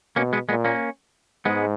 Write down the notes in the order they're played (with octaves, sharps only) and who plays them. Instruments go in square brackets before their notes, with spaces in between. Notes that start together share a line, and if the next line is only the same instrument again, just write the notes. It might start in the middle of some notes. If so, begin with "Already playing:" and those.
[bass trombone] B2 [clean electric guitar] A#3 C#4
[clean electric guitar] G#3 B3
[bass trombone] A#2 [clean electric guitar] G#3 B3
[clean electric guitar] A#3 C#4
[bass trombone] G#2 [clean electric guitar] G#3 B3